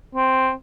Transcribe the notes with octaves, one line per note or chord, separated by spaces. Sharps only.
C4